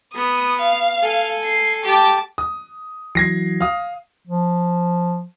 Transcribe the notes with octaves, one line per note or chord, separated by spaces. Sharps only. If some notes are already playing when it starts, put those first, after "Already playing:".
B3 D#6
F5
A4 G#5
C7
G4 A5 D6
D#6
E3 F#3 G#6 A#6 C7
F5 D#6
F3